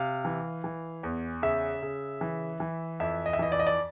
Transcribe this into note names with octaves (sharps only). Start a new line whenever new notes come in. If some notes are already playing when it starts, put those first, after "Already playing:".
Already playing: C3 F5
E3
E3
E2
C#3 E5
C#3
E3
E3
F2 E5
D#5
E5
E3 D#5
D5
D#5
D5